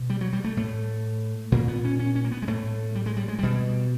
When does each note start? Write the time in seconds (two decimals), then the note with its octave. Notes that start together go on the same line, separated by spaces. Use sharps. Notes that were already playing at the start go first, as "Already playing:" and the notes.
Already playing: B2
0.10 G3
0.21 F#3
0.33 G3
0.44 A3
0.57 A2 A3
1.52 A#2 A#3
1.68 B3
1.85 C#4
1.99 C#4
2.15 C#4
2.24 A#3
2.32 B3
2.42 G#3
2.48 A2 A3
2.95 G3
3.06 G#3
3.17 G3
3.28 G#3
3.39 B2 G3